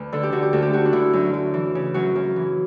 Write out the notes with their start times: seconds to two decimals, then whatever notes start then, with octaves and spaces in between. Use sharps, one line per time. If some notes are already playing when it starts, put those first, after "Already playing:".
Already playing: D2 B4
0.13 D3 A4
0.23 G4
0.32 D3 F#4
0.43 G4
0.53 D2 A4
0.62 G4
0.73 D2 F#4
0.85 D4
0.93 D3 E4
1.13 F#2
1.34 F#2
1.54 E3
1.75 C#3
1.94 F#2 F#4
2.16 F#2
2.36 E3